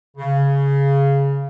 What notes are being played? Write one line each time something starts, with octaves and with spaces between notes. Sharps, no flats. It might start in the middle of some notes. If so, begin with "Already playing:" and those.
C#3